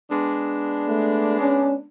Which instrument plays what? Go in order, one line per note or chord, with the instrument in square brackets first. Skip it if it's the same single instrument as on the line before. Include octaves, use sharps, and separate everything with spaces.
[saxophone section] G#3 B3 D4
[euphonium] A3
C#4